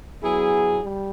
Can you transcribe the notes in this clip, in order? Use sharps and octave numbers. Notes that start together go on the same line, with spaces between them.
F#3 B3 E4 G#4
G3